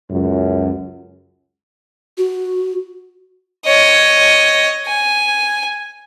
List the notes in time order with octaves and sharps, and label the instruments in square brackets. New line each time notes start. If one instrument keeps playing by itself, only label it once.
[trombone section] C#2 F#2
[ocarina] F#4
[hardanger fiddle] C#5 D#5
G#5